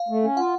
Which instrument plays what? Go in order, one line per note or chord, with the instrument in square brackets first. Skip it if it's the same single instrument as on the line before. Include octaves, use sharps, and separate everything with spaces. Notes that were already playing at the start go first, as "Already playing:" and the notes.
Already playing: [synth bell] F5
[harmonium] A3
C#4
[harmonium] F4 [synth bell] F#5